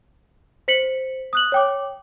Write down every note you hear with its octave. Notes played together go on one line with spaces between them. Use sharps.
C5 B6 C#7 F#7
D#6 F#6 F#7
C#5 G5 D6